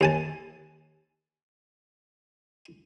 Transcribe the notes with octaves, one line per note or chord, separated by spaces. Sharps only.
D#2 G#5 A5